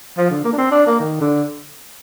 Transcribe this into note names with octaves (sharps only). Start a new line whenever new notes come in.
F3
D3
A#3
D4
C4
D4
A#3
D#3
D3